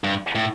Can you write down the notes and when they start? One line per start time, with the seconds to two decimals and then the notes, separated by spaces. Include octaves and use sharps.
0.04 G2
0.35 A2